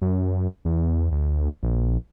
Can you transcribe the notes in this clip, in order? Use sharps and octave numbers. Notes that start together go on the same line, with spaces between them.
F#2
E2
D2
A#1